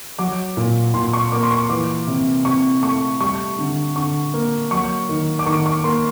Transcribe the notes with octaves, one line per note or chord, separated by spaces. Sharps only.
F#3 D6
A#2
A#2 C6
C#6
A#3 D6
C6
C#6
E3 D6
C3
C3 C#6
A3 C#6
G3 C#6
D3
D3 C#6
A#3
F#3 C#6
D#3
D6
D#3 C#6
C#6
A#3 C6